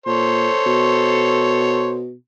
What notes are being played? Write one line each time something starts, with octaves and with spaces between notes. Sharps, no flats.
A#2 A4 C5 C#5
B2